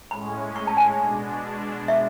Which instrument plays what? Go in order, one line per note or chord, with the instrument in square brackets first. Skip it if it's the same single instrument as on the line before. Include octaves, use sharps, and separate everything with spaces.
[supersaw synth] A2 G#3 C#4 [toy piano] B5
[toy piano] C#6
A5
G#5
[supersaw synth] B2 G#3 D4
[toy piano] E5